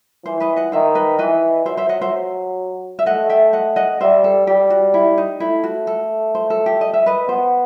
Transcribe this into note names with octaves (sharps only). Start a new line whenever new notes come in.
E3 C5
B4 D#5
D#5 F#5
D#3 C5 E5
B4 D#5
E3 B4 D#5
F#3 C5 E5
C5 E5
D#5 F#5
C5 E5
E5
A3 D#5 F#5
E5 G5
D#5 F#5
D#5 F#5
G3 C5 E5
A4
G3 G4
F#4
E4
D#4
A3 E4
F#4
A4
C5
A4
G4
D#5
E5
B4 D#5
B3 C5